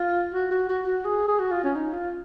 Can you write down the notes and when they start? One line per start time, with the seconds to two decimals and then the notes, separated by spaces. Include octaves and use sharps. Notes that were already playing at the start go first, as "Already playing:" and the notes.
Already playing: F4
0.34 F#4
0.51 F#4
0.69 F#4
0.86 F#4
1.05 G#4
1.28 G#4
1.39 F#4
1.51 F4
1.64 C#4
1.76 D#4
1.93 F4